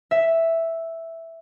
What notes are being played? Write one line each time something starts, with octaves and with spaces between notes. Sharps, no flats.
E5